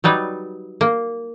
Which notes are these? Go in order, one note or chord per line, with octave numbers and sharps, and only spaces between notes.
F#3 G3 D#4 B4
A#3